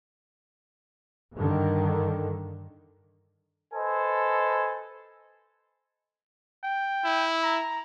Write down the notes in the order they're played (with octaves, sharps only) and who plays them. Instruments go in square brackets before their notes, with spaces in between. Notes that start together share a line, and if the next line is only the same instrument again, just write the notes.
[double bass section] G2 D3 D#3
[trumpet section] A4 B4 C5 D#5 G#5
[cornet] G5
[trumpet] E4
[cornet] A#5